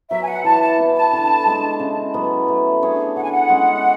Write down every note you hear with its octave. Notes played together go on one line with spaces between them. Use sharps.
F#3 B3 E5
G#5
F#5
E3 A5
A5
B3 E4
A5
D3
G#3 D4
C#3
F#3 B3
A3
D4 G#4 C#5
D3 F#5
G#5
F#5
G#3 C#4